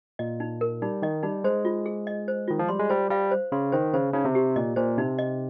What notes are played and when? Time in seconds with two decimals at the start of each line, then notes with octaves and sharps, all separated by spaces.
0.19 A#2 D#5
0.40 D#4
0.61 A#4
0.82 G3 D#4
1.02 D#3 D#5
1.23 G3 D#4
1.44 G#3 C5
1.65 F4
1.86 G#4
2.07 D#5
2.28 C5
2.48 D#3 F4
2.59 F3
2.68 G3 C6
2.80 G#3
2.89 G3 C5
3.10 G3 F5
3.31 C5
3.52 C#3 C6
3.72 D#3 C5
3.94 C#3 C5
4.13 C#3 D#4
4.25 C3
4.35 G4
4.56 A#2 D#5
4.76 A#2 C5
4.97 C3 D#4
5.19 D#5